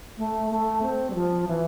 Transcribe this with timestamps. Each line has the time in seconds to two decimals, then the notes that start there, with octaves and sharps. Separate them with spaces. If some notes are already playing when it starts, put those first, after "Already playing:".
0.17 A3
0.50 A3
0.82 C4
1.10 G3
1.14 F3
1.47 E3